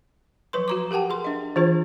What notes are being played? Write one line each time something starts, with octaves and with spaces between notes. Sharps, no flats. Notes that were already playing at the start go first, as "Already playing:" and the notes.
F3 F#3 B4 C6
F#4 A#5 D6
G4 A#4 F#5 G5 A5
G#4 C6
D4 D#5
E3 D4 F4 G#4 C5